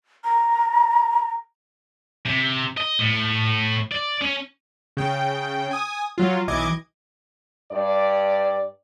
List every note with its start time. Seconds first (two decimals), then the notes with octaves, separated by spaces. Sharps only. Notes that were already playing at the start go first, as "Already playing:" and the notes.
0.24 A#5
2.26 C3
2.77 D#5
2.99 A2
3.92 D5
4.22 C#4
4.97 C#3 G5
5.71 G#5 D#6
6.18 F#3 F4
6.48 B1 E3 D#5 D6 G#6
7.72 G2 D5